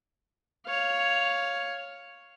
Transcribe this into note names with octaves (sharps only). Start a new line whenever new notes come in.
C#5 F5